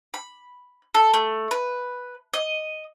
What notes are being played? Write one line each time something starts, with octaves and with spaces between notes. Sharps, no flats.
B5
A4
A3
B4
D#5